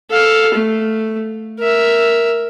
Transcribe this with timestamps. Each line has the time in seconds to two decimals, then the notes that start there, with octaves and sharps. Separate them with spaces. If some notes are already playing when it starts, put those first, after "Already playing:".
0.10 A4 F5
0.54 A3
1.59 A#4 E5